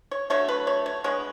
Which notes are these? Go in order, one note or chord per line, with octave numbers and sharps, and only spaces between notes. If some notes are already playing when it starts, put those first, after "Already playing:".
C#5
D3 F#3 A3 C#5
B4
C#5
C#5
D3 G#3 B3 C#5